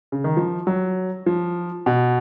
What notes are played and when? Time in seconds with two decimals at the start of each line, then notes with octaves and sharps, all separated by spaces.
0.12 C#3
0.24 D#3
0.37 F3
0.67 F#3
1.26 F3
1.86 B2